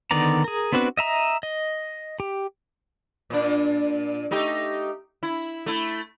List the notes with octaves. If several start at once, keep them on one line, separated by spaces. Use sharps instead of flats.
D3 D#3 B3 D5 A#5
G#4 A#4
B3 C4 D4 F#4 B4
D#5 E5 A#5 E6
D#5
G4
A#2 D4
A3 D#4 G4
E4
A3 E4